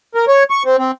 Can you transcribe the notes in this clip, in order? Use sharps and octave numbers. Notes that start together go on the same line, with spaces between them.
A#4
C#5
C#6
C4
C4